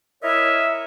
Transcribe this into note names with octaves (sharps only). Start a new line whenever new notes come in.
E4 A#4 C#5 D#5 E5